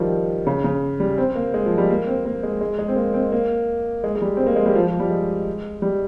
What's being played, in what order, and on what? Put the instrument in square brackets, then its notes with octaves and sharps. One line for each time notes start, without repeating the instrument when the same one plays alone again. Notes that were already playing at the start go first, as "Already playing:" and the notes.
Already playing: [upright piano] D#3 F3 G3
C#3
C#3
G3
C4
A#3
G#3
F3
G3
A#3
C4
A#3
G#3
G#3
G#3
C4
A#3
C4
A#3
G#3
G#3
G3
C4
A#3
G#3
G3
F3
F3
G3
G#3
G3